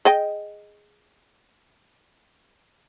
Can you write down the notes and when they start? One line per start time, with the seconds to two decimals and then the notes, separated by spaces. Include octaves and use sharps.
0.05 G#4 D#5 G5